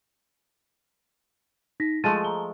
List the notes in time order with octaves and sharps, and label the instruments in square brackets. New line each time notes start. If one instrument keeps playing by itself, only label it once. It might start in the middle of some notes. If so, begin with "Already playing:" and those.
[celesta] D#4 A#6 B6
[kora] F3 G#3 A3 [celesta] A6 D#7
[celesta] A#5 G7